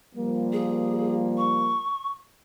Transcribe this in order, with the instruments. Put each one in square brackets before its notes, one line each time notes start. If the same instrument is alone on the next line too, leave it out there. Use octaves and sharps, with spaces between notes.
[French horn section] F3 G3 A#3
[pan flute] G#4
C#6